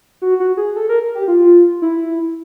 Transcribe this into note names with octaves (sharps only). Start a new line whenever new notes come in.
F#4
F#4
G#4
A4
A#4
G4
F4
E4